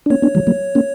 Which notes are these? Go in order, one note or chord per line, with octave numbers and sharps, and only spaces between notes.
D4
A#3 C#4 C#5
B3 D4
E3 G3
F#3 A#3
A#3 C#4